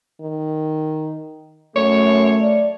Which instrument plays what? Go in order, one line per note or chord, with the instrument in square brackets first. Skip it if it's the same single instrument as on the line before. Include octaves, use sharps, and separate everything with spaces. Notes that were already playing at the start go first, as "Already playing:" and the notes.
[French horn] D#3
[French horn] F#2 [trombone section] A3 [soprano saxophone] C#5
[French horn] D5